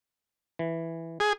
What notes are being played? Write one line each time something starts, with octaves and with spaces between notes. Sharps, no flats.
E3
G#4